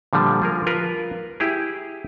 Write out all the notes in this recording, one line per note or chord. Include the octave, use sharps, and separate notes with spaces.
A#2 D3 F3 G3
F3 G#4 A#4
F4 A#4 B4
E4 G4 G#4